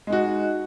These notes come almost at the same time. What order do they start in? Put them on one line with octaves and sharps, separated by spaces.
G#3 D#4 F#4